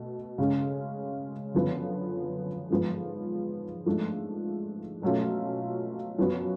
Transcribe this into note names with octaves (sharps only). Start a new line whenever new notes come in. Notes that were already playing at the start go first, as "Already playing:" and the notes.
Already playing: B2 A3
C#3 G#3 C#4
F#2 D3 F3 B3
G#2 F3 B3
G#2 F3 A3 D4
B2 F#3 A3 C#4 F4
F#2 F3 B3 F#4